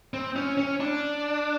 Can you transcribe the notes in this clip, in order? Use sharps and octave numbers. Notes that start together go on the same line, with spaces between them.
C4
C#4
C#4
D4